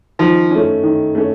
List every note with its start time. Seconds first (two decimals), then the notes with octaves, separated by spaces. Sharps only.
0.19 D#3 F3
0.51 A3 C#4
0.83 D#3
1.15 A3 C#4